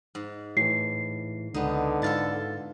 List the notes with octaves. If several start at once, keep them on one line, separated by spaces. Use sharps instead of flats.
G#2
A2 E3 C7
C#2 D3 B3 D#4
G#2 E4 F4 A4 A6